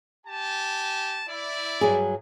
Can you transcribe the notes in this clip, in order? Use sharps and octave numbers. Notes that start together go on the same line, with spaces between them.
G4 G#5 A5
E4 D5
G2 F#3 G#4